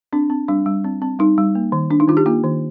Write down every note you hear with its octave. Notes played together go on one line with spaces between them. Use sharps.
C4 D4
C4
G3 D4
G3
C4
C4
G3 D#4
G3
A#3
D#3
D4
D#4
D#3 F4
G4
A#3 F4
D#3